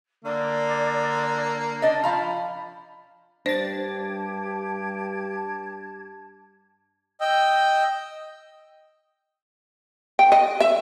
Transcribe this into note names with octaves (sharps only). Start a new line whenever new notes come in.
D3 A#3 D5
D4 D5 D#5
F3 F5 A#5 B5
G2 D4 G4 C5 A5 G#6 A6
D#5 G5 E6
G5
D#5
E5